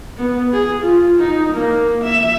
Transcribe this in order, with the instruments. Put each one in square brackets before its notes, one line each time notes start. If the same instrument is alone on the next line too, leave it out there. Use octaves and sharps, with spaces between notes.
[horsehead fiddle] B3
G#4
F4
D#4
A#3
E5